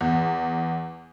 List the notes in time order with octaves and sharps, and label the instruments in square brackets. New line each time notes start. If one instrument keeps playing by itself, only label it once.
[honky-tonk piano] E2